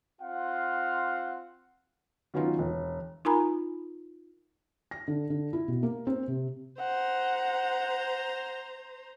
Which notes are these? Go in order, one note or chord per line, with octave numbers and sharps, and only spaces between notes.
C4 F4 F5 F#5
D#3 F#3 B3 C#4 D#4 F4
E1
D#4 F4 A#4 G#5 A#5 B5
A#6
D3
D3
E4
B2
A#3
C4
C3
C5 F#5 A#5